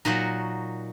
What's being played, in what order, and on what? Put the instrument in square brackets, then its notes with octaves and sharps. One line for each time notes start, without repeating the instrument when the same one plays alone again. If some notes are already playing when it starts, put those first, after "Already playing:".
[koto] A#2 F#3 D#4 F#4